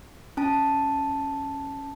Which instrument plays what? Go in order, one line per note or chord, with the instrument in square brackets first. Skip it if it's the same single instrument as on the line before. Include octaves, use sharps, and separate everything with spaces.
[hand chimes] C#4 A5